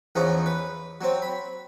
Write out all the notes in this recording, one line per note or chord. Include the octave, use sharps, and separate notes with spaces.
E2 E3 F3 C#4 D#4
B4
F#3 C4
B5